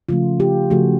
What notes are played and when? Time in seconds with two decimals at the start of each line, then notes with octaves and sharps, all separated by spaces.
0.09 C#3 F3 A3 F4
0.40 F4 G4
0.70 C#3 F3 A3 F#4 G#4